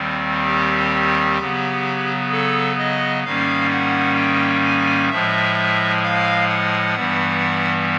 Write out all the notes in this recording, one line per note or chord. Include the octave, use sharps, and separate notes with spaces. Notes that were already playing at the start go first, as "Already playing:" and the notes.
Already playing: D#2 D#3 G3 C4
G4
C#3 F#3 B3
A4
D#5
G#2 D#3 G3 A#3 C#4 F5
F#5
G5
G#5
A2 F3 G#3 E5
F5
F#5
G2 E3 G3 B3